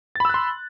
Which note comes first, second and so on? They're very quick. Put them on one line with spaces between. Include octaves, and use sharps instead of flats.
A6 B5 E6 F#6 C6